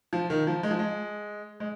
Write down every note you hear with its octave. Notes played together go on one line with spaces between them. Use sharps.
F3
D#3
F3
G#3
F3
G#3
G#3